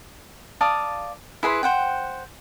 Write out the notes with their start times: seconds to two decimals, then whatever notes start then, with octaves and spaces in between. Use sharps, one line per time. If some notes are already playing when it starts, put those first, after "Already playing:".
0.61 D5 F5 A5 D#6
1.43 E4 G#4 B4 C6
1.63 C5 F#5 G5